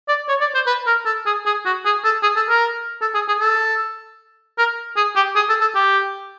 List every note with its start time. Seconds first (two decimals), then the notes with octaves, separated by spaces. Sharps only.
0.08 D5
0.29 C#5
0.41 D5
0.55 C5
0.67 B4
0.87 A#4
1.06 A4
1.26 G#4
1.45 G#4
1.65 F#4
1.85 G#4
2.04 A4
2.23 G#4
2.36 A4
2.49 A#4
3.01 A4
3.14 G#4
3.28 G#4
3.40 A4
4.58 A#4
4.96 G#4
5.16 G4
5.36 G#4
5.49 A4
5.61 A4
5.75 G4